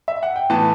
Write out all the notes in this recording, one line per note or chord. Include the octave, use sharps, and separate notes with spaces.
E5
F#5
G5
A2 E3 B3 A5